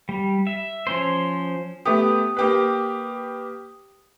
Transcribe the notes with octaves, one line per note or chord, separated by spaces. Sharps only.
G3
E5
F3 C#4 C5
A3 B3 G4 D#6
A#3 G4 B4